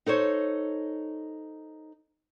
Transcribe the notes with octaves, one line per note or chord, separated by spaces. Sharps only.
D#4 A4 C5 C#5